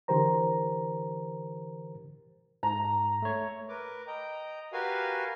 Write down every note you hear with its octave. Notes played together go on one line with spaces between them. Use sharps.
D3 E3 G4 A#4 C5 A#5
G#2 A#5
A3 C#5
A#4 B4 D6
D#5 G5 A#5
F#4 G4 A#4 B4 F5 G#5